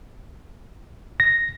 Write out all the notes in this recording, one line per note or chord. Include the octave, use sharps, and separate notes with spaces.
A#6